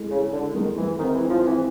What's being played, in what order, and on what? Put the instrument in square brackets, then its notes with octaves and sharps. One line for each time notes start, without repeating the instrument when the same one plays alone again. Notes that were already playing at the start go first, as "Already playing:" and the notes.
Already playing: [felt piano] G#3 E4 A4
[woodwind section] C#3 [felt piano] A4
[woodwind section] D3 [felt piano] A4
[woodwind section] D#3 [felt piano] G#3
[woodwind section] E3 [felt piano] G#3
[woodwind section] D#3 [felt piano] C4
[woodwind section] E3
[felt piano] E4
[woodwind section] F3
[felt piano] C4
[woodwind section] E3